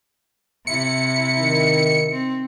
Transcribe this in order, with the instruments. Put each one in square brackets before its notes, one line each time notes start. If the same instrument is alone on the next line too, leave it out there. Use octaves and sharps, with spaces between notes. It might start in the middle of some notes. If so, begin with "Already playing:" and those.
[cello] C3 E4 [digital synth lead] C#7
[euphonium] D#3
[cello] C4